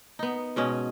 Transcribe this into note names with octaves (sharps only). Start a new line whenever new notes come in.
B3 D#4
G#2 B2 C#4 D#5